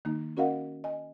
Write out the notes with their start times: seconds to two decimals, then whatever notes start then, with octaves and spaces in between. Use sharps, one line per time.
0.05 D#3 A#3 D#4
0.37 C#4 F#4 A#4 D#5 F5 F#5
0.84 D#5 G#5